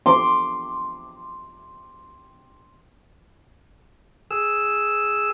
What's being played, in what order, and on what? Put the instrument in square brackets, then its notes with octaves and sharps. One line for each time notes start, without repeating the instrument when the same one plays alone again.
[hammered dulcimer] C6 D6
[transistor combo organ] G#4 E6